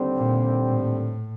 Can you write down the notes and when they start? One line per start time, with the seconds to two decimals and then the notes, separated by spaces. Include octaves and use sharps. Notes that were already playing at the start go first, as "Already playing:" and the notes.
Already playing: D#2 D3 G3 C4
0.17 A#2
0.67 A2